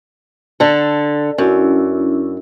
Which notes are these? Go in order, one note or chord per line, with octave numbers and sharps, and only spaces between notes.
D3 A4
F#2 C#4 D4 E4